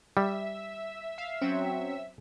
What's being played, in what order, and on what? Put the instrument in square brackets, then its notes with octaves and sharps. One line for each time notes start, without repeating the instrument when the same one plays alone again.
[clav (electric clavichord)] G3 [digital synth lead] E5
[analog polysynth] F5
[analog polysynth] F#3 C4 [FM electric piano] C#4